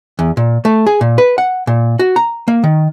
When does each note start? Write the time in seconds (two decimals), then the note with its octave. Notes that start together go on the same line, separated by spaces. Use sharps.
0.19 E2
0.37 A#2
0.65 A3
0.87 G#4
1.01 A#2
1.18 B4
1.38 F#5
1.67 A#2
1.99 F#4
2.16 A#5
2.48 A#3
2.64 D#3